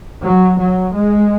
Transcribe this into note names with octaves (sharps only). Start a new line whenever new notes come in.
F#3
F#3
G#3